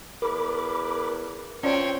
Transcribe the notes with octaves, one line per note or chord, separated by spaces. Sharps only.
E2 A#4 B5 D6
F3 C4 C#4 C#5 D5 G5